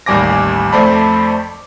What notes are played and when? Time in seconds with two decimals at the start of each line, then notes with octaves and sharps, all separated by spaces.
0.06 A1 D#2 G3 G#5 D6 A#6
0.73 F2 A3 C5 D5 A5 B5